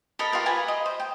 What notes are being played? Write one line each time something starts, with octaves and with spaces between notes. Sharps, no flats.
A4 A#4 D#5 B5
F4 G4 A#4 B4
G4 B4 G#5 A#5
D#5
C5
G5